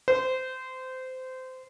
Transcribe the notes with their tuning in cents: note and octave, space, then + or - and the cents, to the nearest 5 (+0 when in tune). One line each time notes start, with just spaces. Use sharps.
C5 -20